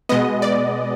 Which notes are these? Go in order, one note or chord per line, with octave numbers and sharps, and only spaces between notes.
B2 G#3 B3 D#5
D5